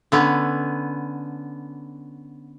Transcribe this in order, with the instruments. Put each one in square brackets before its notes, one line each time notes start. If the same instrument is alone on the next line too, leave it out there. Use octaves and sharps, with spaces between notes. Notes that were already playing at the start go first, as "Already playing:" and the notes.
[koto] D3 B3 C#4